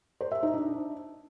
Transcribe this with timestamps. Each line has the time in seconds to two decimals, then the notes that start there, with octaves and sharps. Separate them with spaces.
0.21 C5
0.32 E5
0.43 D#4
0.54 D4